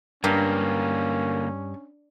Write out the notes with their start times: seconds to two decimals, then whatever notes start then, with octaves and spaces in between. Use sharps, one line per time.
0.24 G2 D3 A#3 C#4 A#4